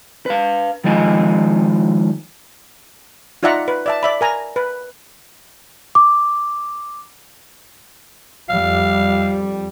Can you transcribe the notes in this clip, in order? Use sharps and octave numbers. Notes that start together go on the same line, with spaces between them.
B4 F5
D#3 F3 G#3 F4 D#5 G#5
D#4 F4 D5 E5 F#5 A#5
B4
D5 E5 A5
D5 E5 B5
A#4 G#5 A#5
B4
D6
F2 G3 F5